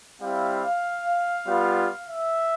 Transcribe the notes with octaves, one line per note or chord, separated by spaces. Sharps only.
G3 C4 E4 G4 F5
G3 B3 F4
E5